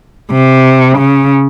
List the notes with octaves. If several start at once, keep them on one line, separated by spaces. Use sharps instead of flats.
C3
C#3